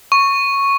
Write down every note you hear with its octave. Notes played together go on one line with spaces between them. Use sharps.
C#6